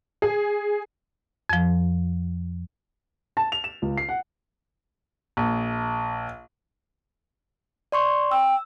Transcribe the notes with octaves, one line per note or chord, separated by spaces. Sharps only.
G#4
F2 F3
A5
F7
E7
C#2
C7
F#5
A#1
D5 C6 C#6
G5 E6